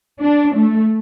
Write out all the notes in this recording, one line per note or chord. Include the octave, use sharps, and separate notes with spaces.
D4
A3